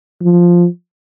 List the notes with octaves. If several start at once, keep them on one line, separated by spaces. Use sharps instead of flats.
F3